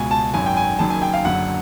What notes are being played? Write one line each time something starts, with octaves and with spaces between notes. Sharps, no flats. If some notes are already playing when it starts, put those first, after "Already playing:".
Already playing: C#2 B2 G#5
A5
G#1 F#2 D#3 G#5
G5
G#5
F#1 F#2 D#3 A5
G#5
G5
F5
F#1 F#2 D3 F#5